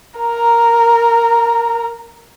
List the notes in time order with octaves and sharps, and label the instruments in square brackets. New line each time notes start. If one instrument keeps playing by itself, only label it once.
[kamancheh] A#4 A#5